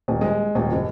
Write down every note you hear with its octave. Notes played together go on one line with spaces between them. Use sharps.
D#1
G#3
D#1
F#1